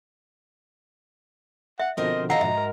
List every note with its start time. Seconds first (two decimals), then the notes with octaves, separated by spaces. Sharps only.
1.80 E5 F#5
1.97 B2 D3 F3 C4 A#4 C5 D#5
2.30 A4 D#5 F5 F#5 A#5
2.41 G#2 F#3 E5
2.57 A#4